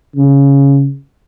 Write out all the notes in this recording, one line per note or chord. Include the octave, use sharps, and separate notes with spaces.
C#3